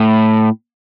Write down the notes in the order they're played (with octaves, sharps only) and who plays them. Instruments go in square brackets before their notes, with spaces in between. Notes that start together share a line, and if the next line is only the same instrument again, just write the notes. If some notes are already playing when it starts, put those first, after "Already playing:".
Already playing: [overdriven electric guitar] A2